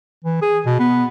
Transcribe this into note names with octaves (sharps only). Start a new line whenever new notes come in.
E3
G#4
B2
B3